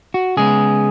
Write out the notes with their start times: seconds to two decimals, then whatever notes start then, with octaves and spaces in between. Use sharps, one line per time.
0.14 F#4
0.37 C#3 G#3 B3 G#4